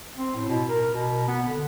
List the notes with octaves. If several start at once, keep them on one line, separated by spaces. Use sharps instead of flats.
C4
A2
B2
A#4
B2
B3
D3